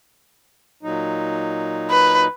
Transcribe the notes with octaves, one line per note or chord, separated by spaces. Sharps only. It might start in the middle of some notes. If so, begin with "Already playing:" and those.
A#2 F#3 D#4
B4